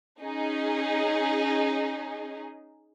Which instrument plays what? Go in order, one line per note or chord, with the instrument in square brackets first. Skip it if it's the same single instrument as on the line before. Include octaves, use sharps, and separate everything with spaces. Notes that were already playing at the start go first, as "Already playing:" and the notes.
[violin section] C#4 D#4 G#4